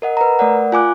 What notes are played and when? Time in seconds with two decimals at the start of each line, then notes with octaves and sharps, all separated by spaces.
0.02 A#4 D#5 F#5
0.17 B4 A#5
0.39 A3 A#4 D5 F#5
0.72 F4 G#5 D6 F#6